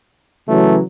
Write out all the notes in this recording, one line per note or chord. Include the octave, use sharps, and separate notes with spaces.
C#3 E3 F#3 A3